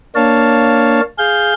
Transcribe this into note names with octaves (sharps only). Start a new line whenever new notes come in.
A#3 D4 C#5 F5 A5
G#4 F5 G6